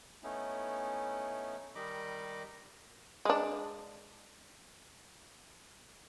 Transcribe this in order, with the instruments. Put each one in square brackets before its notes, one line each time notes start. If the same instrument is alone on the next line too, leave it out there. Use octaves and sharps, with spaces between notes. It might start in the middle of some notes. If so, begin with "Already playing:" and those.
[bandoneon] A3 B3 C#4 D#4 E4
D#3 G3 D#4 D#5 B5 D6
[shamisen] G#3 D4